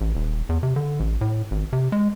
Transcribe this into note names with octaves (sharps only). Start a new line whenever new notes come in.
A1
D#1
E2
C3
D3
A1
A2
G#1
C3
G#3